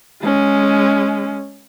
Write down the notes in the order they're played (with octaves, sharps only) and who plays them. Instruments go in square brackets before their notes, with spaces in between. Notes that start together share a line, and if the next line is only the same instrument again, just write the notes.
[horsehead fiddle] G#3 C#4